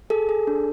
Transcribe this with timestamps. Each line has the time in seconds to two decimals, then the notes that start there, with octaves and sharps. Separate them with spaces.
0.10 G#4 A4
0.29 G#4
0.47 D4